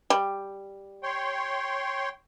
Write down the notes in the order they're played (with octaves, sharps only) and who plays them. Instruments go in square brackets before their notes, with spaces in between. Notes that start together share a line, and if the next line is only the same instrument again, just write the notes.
[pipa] G3
[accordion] C#5 G5 C6